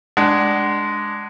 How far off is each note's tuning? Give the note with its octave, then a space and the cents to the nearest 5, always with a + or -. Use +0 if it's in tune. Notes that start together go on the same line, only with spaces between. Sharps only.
G#3 +0 D4 +5 F#5 +30